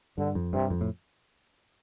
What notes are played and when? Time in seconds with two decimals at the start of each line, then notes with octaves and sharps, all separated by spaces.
0.18 G2 D3
0.35 F2
0.53 G2 C3
0.70 F2
0.81 A2